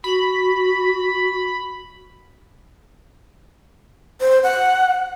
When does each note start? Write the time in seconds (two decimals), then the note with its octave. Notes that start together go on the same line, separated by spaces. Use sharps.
0.04 F#4 B5
4.21 C5
4.44 F#5